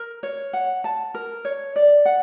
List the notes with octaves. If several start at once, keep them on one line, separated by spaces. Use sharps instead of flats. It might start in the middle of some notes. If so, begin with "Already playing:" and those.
Already playing: A#4
C#5
F#5
A5
A#4
C#5
D5
F#5